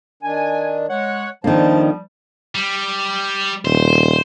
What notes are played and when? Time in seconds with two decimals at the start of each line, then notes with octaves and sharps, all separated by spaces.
0.23 D#3 D4 G#5
0.89 G#3 C#5 F#5
1.44 F2 D#3 F3 G3 A#3 D4 C5 A5
2.55 G3
3.65 D#1 C5